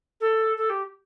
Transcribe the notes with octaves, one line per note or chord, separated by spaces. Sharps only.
A4
A4
G4